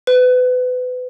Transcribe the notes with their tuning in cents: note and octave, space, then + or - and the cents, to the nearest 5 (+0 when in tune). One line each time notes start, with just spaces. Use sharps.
B4 +30